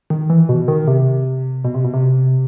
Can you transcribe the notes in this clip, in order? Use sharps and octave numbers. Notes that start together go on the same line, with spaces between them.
D#3
E3
B2
D#3
C3
B2
C3
B2
C3